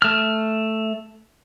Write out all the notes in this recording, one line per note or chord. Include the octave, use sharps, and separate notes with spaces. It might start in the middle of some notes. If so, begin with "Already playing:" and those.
A3 F6